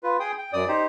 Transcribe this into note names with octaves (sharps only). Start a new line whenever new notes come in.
F4 B4
G#4 G5 D#6
G5
F#2 D5 D#6
D#4 G4 C5